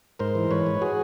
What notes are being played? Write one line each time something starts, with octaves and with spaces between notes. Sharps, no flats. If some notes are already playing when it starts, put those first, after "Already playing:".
G#2 A#4 C5
E3
G#2 B4 C#5
G#2
F#4 G#4